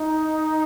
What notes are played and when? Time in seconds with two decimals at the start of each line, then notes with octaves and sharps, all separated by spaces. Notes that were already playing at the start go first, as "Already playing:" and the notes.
Already playing: D#4